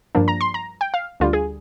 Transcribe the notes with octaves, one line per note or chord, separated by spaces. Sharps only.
G2 F3 A#3 D4
A#5
C6
A#5
G5
F5
D2 D3 G3 F4
G#4